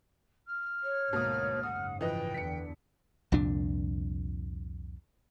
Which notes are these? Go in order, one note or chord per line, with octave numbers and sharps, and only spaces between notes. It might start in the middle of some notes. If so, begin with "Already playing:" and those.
F6
C#5
D2 G#2 B2 A#3 D#6
F#1 G#2 C#3 F#5 D#6
E3 F3 B4 D#5 G5
E2 D3 B6 C#7
C2 F2 A#2 D4